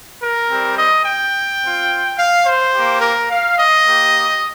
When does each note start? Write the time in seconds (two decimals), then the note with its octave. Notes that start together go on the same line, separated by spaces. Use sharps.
0.22 A#4
0.50 G3 C4 G4
0.78 D#5
1.05 G5
1.62 C4 F4
2.17 F5
2.45 C5
2.73 A#3 G4
3.01 A#4
3.30 F5
3.57 D#5
3.86 A#3 G4